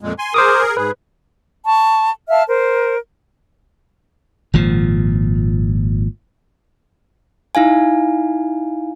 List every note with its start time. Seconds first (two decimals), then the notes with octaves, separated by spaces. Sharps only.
0.01 F2 A#2 G#3
0.19 G#5 C6
0.34 G#4 A#4 C5 D6 D#6
0.77 G#2 G#4 B4
1.67 A5 C#6
2.29 E5 F5 A5 F6
2.47 A#4 C5
4.54 G#1 A#2 F3
7.55 D#4 E4 F5 G#5